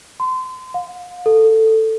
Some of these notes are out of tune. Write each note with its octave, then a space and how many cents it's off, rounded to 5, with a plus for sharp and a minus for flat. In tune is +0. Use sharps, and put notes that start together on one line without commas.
C6 -30
F5 +40
A4 +10